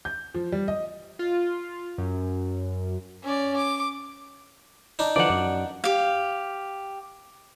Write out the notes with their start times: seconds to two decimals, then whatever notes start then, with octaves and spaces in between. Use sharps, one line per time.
0.05 G6
0.35 F3
0.52 G3
0.68 D#5
1.19 F4
1.98 F#2
3.24 C#4 D5
3.57 D6
4.99 D4 D#4
5.16 D3 E3 F3 D5 F#5
5.29 F#2
5.84 G4 F5